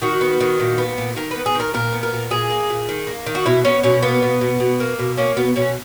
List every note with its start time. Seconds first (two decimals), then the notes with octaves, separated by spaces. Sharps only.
0.02 D#3 F#4
0.21 B3
0.40 D#3
0.60 A#2
0.78 B3
0.98 A#2
1.16 D#3 A#4
1.31 B3 B4
1.46 G#4
1.55 D#3 A#4
1.74 A#2 A#4
1.93 B3
2.03 A#4
2.12 A#2
2.31 A#2 G#4
2.50 A#3
2.70 A#2
2.89 D#3
3.07 A#3
3.27 D#3
3.35 F#4
3.46 B2 E4
3.65 B3 C#4
3.83 B2 C#4
4.02 A#3 B3
4.22 B2
4.41 B2
4.60 B2
4.80 A#3
4.99 B2
5.17 A#3 C#4
5.36 B2 B3
5.56 B2 C#4